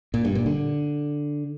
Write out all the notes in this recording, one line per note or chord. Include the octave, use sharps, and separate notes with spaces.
A#2
G2
A#2
D3